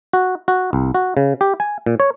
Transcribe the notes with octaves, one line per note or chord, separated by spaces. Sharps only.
F#4
F#4
C2
F#4
C#3
G4
G#5
A#2
C#5